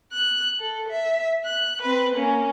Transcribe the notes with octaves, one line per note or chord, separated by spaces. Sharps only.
F#6
A4
E5
F#6
C4 B4
A#3 C#4